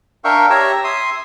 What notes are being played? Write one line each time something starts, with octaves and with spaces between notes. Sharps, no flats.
D4 A#4 E5 F5 G5 C#6
G4 C#5 E5 A#5 E6
E5 C6 D#6